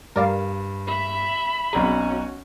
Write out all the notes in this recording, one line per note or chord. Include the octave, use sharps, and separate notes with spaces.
G2 A#4 D5 F5
E5 B5
B1 F#3 C4 C#4 F#4 G#4 D5 A#5